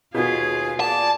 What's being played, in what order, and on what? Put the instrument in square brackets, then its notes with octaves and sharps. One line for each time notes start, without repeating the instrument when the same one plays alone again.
[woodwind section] D#2 G#4 [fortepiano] B2 B3 [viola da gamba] F4
[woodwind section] A#3 G#4 D5 [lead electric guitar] A5